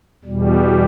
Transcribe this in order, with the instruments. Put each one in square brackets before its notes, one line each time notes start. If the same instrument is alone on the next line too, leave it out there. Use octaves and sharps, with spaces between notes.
[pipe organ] E2 B2 G3